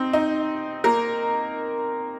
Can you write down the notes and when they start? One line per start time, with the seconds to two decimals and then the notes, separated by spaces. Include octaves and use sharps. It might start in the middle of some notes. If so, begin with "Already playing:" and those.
Already playing: C4 D#4
0.13 D#4
0.84 A#3 A#4